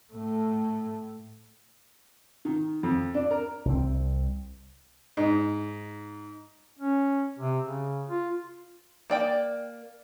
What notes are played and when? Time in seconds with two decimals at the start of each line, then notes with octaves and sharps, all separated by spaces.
0.13 A2 A3
2.45 D#3
2.83 F2
3.14 D4
3.31 A#4
3.65 C2 C4
5.17 G#2
6.79 C#4
7.39 C3
7.66 C#3
8.08 F4
9.10 A#3 D5 G5